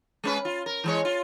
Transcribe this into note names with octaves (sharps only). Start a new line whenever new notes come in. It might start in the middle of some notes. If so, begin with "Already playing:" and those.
G#3 C#4 B4
F4
A#4
E3 G#3 C#5
F4